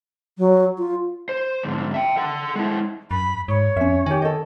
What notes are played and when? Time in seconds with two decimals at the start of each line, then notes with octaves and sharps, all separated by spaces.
0.38 F#3
0.78 F4
1.29 C5
1.63 D2 G#2
1.94 E5 G5
2.17 A4 F#5
2.56 G#3 E4
3.11 F#2 B5
3.48 G#2 C#5
3.76 F2 C#4 E5
4.06 D#3 G4 G#5
4.22 A4 D#5